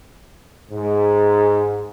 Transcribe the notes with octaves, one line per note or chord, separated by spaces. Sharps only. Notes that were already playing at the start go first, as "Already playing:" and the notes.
G#2